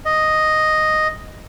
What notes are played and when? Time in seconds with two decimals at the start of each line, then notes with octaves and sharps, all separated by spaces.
0.05 D#5